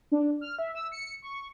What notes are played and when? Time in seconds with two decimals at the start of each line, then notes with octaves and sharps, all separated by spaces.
0.12 D4
0.41 F6
0.59 E5
0.75 E6
0.92 C#7
1.22 C#6